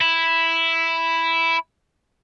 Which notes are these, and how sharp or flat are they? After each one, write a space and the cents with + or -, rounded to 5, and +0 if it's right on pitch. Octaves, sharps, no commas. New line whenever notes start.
E4 +0